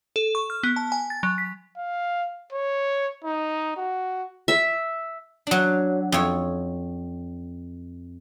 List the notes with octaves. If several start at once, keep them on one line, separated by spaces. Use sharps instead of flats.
A4
C#6
F6
B3
A5
G#5
A6
F#3
B6
F5
C#5
D#4
F#4
E5
F#3 D4
F2 C#5